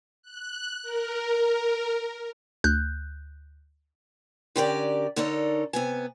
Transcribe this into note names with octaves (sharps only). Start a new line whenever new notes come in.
F#6
A#4
D2 F#6 G6
D3 C#4 G4 A#4 C5 D5
D3 D4 D#4 A4 A#4 C#5
C3 B3 G#5